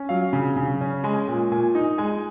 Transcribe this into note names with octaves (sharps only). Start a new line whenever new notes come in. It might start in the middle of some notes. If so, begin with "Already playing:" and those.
Already playing: C#4
F#3 F5
C#3
C#3
C#4
G#3 G#5
A#2
A#2 G#5
D#4
G#3 G#5